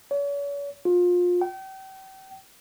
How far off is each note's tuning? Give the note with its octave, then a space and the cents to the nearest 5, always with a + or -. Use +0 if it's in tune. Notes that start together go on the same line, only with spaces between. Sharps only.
C#5 +40
F4 +25
G5 -35